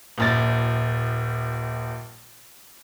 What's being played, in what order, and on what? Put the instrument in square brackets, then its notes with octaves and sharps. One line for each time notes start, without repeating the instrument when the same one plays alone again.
[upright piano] D#1 A#1 A6